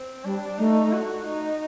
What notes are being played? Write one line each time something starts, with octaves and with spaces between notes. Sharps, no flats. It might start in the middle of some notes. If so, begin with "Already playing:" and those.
Already playing: C4
G3 D4
A3 D#4
F#4
D#4